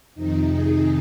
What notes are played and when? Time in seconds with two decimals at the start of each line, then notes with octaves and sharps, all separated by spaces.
0.15 F2 C3 D#3 D#4
0.50 G#4